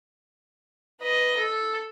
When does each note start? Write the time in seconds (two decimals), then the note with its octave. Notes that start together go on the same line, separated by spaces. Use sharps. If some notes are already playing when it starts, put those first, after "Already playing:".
1.01 B4 D#5
1.37 A4